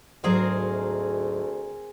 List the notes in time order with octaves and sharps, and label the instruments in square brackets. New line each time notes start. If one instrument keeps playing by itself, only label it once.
[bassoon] D2 [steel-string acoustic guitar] G#2 F#3 G#3 [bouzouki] C4 G#4 A#4